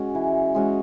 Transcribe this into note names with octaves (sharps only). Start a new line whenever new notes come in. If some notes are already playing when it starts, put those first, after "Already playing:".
Already playing: G#3 C#4 F#4
E3
G#3 C#4 F#4